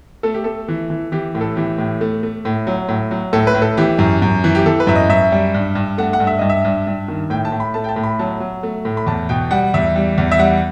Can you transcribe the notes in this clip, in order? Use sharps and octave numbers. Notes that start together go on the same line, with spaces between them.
A3 A4
G4
A3 A4
E3
E3
E3 G4
A2
A4
E3 G4
A2
A3
A3
A2
F#3
A2
F#3
A2 A4
B4
A2
A4
E3 G4
F#2
F#2
E3
G4
E3 A4
B4
F#2 E5
D#5
F#2 E5
G3
G2
G2
A3 F#5
F#5
G2
E5
G2 D#5
E5
G2
G2
D#3
A2 G5
A5
A2
B5
A3 A5
G5
A5
A2
B5
F#3 A5
F#3
A3
A2
B5
E2 A5
B2 G5
G3 F#5
E2 E5
G3
E2
E5
G3 F#5